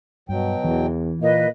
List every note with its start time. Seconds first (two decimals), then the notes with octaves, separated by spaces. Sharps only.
0.29 G2 B2 F#3 G5
0.64 E2 E3
1.21 A#2 A#3 B4 D#5